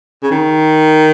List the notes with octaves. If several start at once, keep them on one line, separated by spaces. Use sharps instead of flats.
C#3
D#3